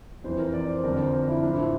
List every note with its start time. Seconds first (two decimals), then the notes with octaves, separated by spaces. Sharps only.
0.24 F2 E3 C5
0.39 A#4
0.54 D5
0.69 C5
0.83 F2 D3 F3 A#4
0.92 D5
0.98 C5
1.13 A#4
1.28 E4
1.43 A2 F3 D4
1.53 E4
1.62 F4